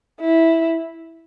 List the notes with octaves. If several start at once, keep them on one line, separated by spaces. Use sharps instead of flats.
E4